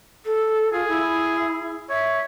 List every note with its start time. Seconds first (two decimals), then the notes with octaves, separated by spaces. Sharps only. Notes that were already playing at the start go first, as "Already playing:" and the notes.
0.25 A4
0.72 F4 G#4
0.88 E4
1.89 C#5 E5